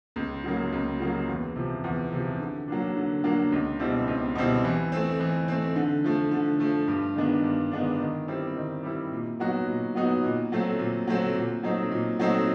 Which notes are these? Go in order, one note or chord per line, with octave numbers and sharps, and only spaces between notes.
C#2
C#3 F#3 A#3
C#2
C#3 F#3 A#3
E2
C3 F3
E2
C3 F3
D3
F#3 A#3 D4
D3
F#3 A#3 D4
C#2
B2 G3 C4 E4
C#2
B2 G3 C4 E4
E3
A3 C4
E3
A3 C4
D3
F3 A3
D3
F3 A3
G2
D#3 G#3 B3 D4
G2
D#3 G#3 B3 D4
D#3
G3 C4 E4
D#3
G3 C4 E4
A#2
F#3 B3 D#4 F#4
A#2
F#3 B3 D#4 F#4
A#2
F#3 A3 C4
A#2
F#3 A3 C4
A#2
F#3 A3 C4 D#4
A#2
F#3 A3 C4 D#4